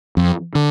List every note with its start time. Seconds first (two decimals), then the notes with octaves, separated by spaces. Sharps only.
0.17 F2
0.55 D3